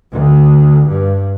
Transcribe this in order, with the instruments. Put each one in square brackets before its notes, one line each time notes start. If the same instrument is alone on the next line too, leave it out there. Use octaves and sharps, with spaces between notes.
[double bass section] D2
G2